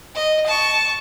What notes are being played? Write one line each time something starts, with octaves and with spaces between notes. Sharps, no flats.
D#5
A5 C#6